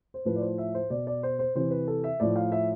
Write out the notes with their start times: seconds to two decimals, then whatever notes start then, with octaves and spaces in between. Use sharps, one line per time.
0.14 C5
0.25 A2 F3 B4
0.36 D5
0.41 C5
0.58 E5
0.75 C5
0.90 B2 D5
1.07 D5
1.23 C5
1.39 C5
1.55 C3 E3 C5
1.71 B4
1.87 A4
2.04 E5
2.20 A2 F3 D5
2.36 F5
2.52 E5